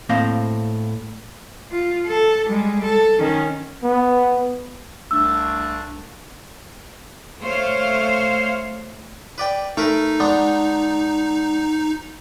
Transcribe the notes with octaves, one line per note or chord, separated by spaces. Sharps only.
A2 A#3 C4 C5 D#5 F5
F4
A4
G3 G#3
A4
D#3 C#4
B3
C2 A3 D4 E6
A3 C5 C#5 F5
B4 D5 G5
A3 D#4 A#4 B4
G#3 B3 D4